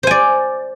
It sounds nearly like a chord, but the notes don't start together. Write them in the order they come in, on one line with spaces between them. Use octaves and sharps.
C5 G#5 D5